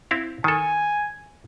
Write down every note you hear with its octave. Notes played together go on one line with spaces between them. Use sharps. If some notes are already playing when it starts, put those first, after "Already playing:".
C4 E4 F5
D#3 A4 G#5